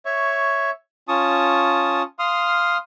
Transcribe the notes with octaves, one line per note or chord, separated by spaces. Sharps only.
C#5 E5 C#6
C#4 F4 A5 C#6 D#6
F5 C6 D#6 F6